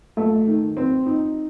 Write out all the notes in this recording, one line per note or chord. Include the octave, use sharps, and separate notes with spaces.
A3
D#3
C4
D#4